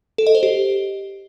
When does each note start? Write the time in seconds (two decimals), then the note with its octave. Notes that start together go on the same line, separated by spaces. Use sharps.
0.18 A4
0.27 D#5
0.35 C5
0.43 G4